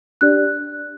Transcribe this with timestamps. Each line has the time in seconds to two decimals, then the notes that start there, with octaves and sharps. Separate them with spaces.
0.21 D4 G4 D5 F#6